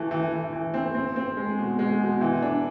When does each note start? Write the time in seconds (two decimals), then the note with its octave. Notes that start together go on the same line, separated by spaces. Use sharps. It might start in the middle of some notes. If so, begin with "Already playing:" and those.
Already playing: E3 A3
0.11 E3
0.32 E3
0.53 E3
0.74 C4
0.95 C4
1.16 C4
1.37 G#3
1.58 B2
1.79 G#3
2.00 B2
2.21 E3
2.42 D4